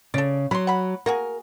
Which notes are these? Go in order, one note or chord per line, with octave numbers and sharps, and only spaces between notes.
C#3 A4 D5
F#3 B5 C6
F#5 B5
A#3 F#4 G#4 A#4